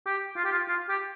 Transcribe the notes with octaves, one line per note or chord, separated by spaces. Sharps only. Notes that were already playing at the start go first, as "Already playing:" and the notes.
G4
F4
G4
F4
F4
G4